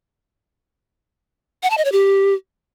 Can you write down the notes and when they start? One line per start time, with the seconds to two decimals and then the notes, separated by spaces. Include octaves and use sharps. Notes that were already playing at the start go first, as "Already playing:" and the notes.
1.63 F#5
1.70 A5
1.78 D#5
1.85 C#5
1.92 G4